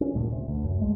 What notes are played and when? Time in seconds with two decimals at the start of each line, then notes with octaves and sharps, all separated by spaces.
0.01 C#4
0.14 D2 G2 A#2
0.32 D2 C3
0.48 D2
0.65 F#2
0.79 C2 G#3 A3